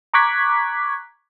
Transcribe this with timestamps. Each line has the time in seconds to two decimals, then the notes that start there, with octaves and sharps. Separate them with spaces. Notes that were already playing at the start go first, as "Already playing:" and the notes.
0.14 A#5 C#6 D6 F#6 G#6 B6